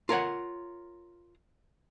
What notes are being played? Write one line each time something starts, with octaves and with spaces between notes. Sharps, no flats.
F4 A#4 C#5 F#5